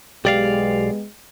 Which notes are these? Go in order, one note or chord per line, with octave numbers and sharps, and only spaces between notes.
B1 G#3 B3 G4 D5 F5